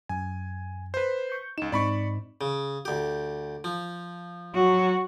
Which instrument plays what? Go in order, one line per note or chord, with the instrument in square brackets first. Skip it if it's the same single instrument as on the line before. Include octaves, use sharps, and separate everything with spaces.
[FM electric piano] F#2 [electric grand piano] G#5
[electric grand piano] B4 C5
[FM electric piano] C#6 G6
[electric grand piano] C#2 E7 [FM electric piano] D#4
[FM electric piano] G#2 C4 D#4 [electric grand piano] D5 B5 C#6
[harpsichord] C#3
D2 G4
F3
[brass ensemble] F#3 [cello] F#4